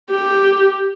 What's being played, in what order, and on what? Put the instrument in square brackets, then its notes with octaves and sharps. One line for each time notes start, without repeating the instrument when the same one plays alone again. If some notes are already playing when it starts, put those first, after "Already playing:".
[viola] G4